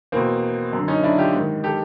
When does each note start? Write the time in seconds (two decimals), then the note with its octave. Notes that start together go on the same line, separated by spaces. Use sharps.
0.12 E2 B2 A#3 C4
0.73 F#2 D3
0.88 C#4 D#4
1.03 D4 E4
1.18 F4 G4
1.34 G#2 D#3
1.64 G4 A4